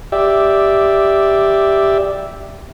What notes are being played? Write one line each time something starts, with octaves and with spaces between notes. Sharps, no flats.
G4 D5 E5